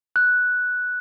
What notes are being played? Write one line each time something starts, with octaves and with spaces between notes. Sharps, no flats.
F#6